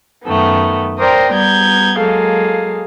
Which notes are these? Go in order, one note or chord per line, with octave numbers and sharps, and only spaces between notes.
F#2 D#3 A3 B3
A#4 C5 D5 G5 A#5 D#6
G3 B3 A#5 G6 G#6
F#3 G#3 A#3 G#4 A4 F5